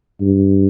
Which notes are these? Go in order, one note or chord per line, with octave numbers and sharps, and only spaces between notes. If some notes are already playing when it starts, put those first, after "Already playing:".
G2